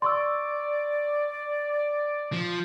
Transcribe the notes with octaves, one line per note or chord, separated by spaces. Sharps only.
D5 C6 C#6 E6
F3